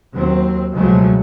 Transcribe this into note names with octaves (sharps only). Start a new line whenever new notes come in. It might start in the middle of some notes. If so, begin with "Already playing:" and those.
D#2 F#3 C4
C#2 B2 F3 F#3 G#3 A3